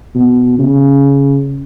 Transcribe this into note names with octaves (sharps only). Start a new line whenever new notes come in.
B2
C#3